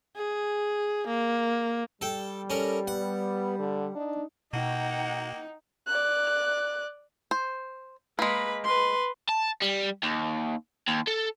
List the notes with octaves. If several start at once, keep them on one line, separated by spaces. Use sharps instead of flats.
G#4
A#3
G3 A4 G5
C#4 A4 A#4
B3 F#5
D3
D4 D#4
B2 A#3 D#4 F#5 G5
D5 F#6
C5
G#3 A#3 B4 B5
B4 C6
A5
G3
D#2
D#2
A4